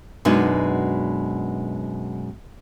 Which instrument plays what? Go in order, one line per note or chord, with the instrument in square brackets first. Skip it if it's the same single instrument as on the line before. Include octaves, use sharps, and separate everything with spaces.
[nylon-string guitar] F#2 B2 G#3 B3 D4 D#4